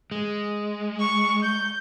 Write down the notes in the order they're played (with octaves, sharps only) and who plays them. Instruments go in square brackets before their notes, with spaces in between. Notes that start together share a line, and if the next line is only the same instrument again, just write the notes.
[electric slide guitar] G#3
[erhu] C#6
G6